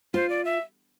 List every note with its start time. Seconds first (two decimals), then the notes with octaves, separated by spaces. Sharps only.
0.14 F4 C5
0.30 D5
0.45 E5